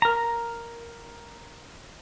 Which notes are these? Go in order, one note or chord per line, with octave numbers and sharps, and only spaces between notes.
A#4 A#5